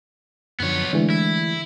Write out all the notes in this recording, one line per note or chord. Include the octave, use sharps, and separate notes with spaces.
F#2 D3 F3 B3 C#5
D3 E3 G#3 A3 D4
E4